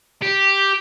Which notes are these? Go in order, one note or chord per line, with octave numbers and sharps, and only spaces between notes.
G4